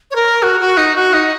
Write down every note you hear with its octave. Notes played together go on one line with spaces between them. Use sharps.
C#5
A#4
F#4
F#4
D#4
F#4
D#4